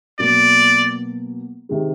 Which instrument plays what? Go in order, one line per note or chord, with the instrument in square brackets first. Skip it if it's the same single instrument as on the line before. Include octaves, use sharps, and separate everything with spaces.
[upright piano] B2 F#3 A#3 [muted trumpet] D5
[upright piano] C3 D#3 G#3